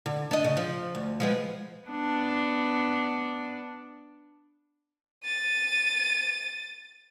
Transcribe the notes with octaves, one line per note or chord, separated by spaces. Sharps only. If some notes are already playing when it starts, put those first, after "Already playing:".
D3
D4 D#5
C#3
F3
D2
F3 G#3 B3
B3 D4
A6 D#7